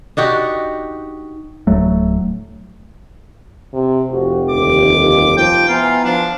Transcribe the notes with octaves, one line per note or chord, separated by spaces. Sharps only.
D4 D#4 F#4 G4
D1 F#3 A3
C3
F1 F3 F#4 G4
G1 D#2 D6
F3 G5
B3 E4 F4 G#5 A#5
F3 D4